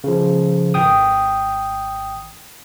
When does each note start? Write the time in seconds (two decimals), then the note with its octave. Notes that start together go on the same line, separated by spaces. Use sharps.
0.04 C#3 F3
0.74 G#1 G5 D#6